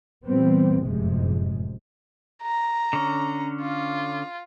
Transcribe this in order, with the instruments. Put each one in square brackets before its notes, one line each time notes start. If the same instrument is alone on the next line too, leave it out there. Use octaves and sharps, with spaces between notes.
[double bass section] A#2 E3 G3 B3 C4
F1 F#2 A2 C3 F3 G#3
[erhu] A#5
[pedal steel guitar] D3 C#4
[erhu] F4